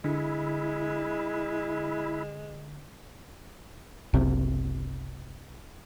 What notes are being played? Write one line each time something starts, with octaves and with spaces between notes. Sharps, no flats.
D3 G#3 E4
F#1 C2 C3